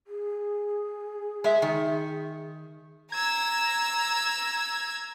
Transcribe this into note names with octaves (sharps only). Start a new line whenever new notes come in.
G#4
G#3 E5
D#3
A#5 E6 G#6